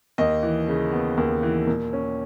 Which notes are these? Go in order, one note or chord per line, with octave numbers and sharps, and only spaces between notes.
D#2 D#5
E3
C#3
B3
D#2
E3
A#2
C#4